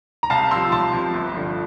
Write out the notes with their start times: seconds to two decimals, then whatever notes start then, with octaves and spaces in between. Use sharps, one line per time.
0.23 A#5
0.30 C2 F5 A5
0.51 C3 F3 C6 E6
0.72 C2 A5 C6
0.93 C3 F3
1.14 G1
1.35 G2 D3 F3